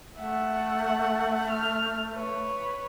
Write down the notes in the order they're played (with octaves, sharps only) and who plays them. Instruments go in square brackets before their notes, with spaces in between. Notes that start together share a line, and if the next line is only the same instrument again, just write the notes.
[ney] A3 [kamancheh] E5 F#5
[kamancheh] F6
B4 C#5